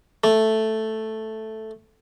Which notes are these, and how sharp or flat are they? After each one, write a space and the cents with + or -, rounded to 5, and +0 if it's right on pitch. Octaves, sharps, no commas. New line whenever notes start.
A3 +0